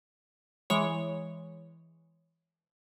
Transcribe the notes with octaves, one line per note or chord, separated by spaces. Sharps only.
E3 G#3 C#5